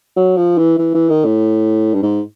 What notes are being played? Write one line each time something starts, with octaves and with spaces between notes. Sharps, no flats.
F#3
F3
E3
E3
E3
D#3
A2
G2
G#2